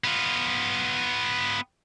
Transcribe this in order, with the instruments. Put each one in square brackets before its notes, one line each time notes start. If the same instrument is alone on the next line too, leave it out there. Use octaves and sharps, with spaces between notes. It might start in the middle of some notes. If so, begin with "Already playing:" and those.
[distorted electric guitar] B3 F4